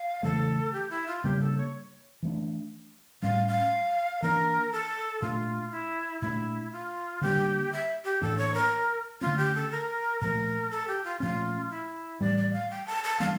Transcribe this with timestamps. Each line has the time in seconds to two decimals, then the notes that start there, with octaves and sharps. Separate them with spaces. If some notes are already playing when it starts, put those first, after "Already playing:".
Already playing: F5
0.23 C#3 E3 A3 A4
0.73 G4
0.90 E4
1.07 F4
1.24 C#3 G3 A#3 D4 G4
1.40 A4
1.57 C#5
2.23 E3 A3 D4
3.22 A2 G3 C#4 F5
3.48 F5
4.22 E3 A#3 D4 A#4
4.72 A4
5.22 A#2 A3 D4 F4
5.72 E4
6.21 A#2 A3 D4 E4
6.72 F4
7.22 D3 G3 A#3 D4 G4
7.72 E5
8.05 G4
8.21 A2 E3 A#3 D4 A4
8.38 C#5
8.54 A#4
9.21 D3 A3 C#4 F4
9.37 G4
9.55 A4
9.72 A#4
10.21 A#2 F3 A3 A#4
10.71 A4
10.88 G4
11.04 F4
11.20 A#2 F3 A3 C#4 F4
11.71 E4
12.21 A2 E3 G3 D5
12.37 D5
12.53 F5
12.71 G5
12.86 A5
13.04 A5
13.19 E3 G3 A#3 D4 F5